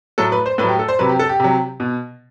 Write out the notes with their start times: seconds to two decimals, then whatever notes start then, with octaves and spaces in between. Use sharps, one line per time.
0.18 A2 F#3 A4
0.32 B4
0.46 C5
0.58 A2 B4
0.64 F#3 G4
0.79 A4
0.88 C5
0.99 C3 F#3 B4
1.09 G4
1.19 A4
1.29 G4
1.40 C3 F#3
1.80 B2